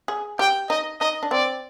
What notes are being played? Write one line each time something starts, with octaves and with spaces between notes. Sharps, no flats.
G#4
G4 G5
D#4 D#5
D#4 D#5
D4
C4 D5